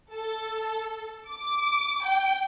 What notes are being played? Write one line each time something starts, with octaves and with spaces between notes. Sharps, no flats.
A4
D6
G5